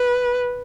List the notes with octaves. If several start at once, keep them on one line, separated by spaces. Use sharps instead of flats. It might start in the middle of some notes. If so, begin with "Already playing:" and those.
Already playing: B4